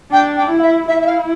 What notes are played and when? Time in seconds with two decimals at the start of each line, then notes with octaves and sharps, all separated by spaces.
0.12 D4 G5
0.37 G5
0.50 E4
0.59 F5
0.62 E5
0.88 E4 E5
1.02 E5
1.06 F5